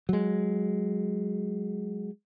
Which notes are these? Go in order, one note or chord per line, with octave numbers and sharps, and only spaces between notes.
F#3 G#3